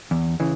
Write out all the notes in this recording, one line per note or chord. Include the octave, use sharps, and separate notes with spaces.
E2
C#3 E3